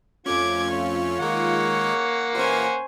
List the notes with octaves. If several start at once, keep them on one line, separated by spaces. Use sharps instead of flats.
F2 A3 C#4 F4 D6 G#6
C#5
D#3 G#3 A#3 F#5
A#2 E3 C#4 F4 G4 A#4 C5 G#5